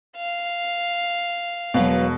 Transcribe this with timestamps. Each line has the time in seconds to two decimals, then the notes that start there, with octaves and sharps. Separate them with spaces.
0.17 F5
1.74 E1 B2 F#3 B4 F5